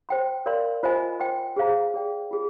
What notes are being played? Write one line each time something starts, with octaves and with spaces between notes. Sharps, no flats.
C5 G5 C6
A#4 D5 F5 C6
F4 C5 D#5 G#5
C5 G5 C6
G#4 C5 F5 A#5
G#4 D5 G5
F4 G#4